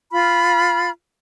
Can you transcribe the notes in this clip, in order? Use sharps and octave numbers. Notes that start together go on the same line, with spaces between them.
F4 B5 F6